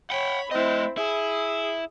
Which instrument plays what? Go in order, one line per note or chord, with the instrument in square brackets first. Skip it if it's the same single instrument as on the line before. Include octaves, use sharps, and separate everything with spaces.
[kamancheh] C#5 B5 [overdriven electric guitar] F#5 G5
[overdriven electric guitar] A3 D#5 [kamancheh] C4 E4
[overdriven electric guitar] E4 [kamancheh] G#4